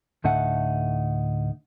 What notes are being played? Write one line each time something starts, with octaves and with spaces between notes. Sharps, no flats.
D2 A2 D4 D#4 E5 F#5